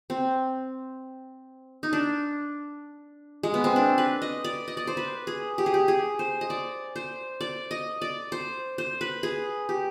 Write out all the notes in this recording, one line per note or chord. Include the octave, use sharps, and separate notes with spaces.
C4
D#4
D4
G#3
B3
C4
D4
B4
D#5
D5
D#5
D5
C5
B4
G#4
G4
G#4
G4
G#4
C5
D#5
D5
C5
D5
D#5
D5
C5
C5
B4
G#4
G4